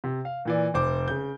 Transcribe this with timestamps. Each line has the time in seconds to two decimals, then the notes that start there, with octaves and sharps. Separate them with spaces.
0.04 C3
0.25 F5
0.45 A#2 E3 D5
0.74 F1 C5 D6
1.08 C#3 G6